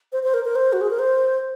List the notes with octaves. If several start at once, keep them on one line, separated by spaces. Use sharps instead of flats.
C5
C5
A#4
A#4
C5
F#4
G#4
A#4
C5